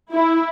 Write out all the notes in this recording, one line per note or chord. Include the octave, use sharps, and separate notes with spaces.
E4